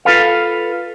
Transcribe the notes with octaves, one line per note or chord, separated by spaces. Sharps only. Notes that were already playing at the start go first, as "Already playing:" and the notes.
F4 A4 B4 F5